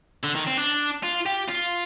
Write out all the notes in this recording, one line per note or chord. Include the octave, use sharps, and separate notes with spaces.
D3
D#3
C4
D4
F4
G4
F4